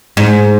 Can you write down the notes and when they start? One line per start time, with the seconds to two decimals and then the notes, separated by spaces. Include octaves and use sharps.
0.17 G#2